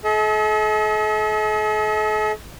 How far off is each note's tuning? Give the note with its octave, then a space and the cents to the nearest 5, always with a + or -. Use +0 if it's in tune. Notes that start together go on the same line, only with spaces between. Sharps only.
A4 -45 D#5 +45